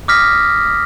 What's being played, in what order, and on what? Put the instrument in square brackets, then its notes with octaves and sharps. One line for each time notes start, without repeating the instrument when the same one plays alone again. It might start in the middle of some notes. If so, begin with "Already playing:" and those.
[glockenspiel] D6 D#6 F6 A#6 B6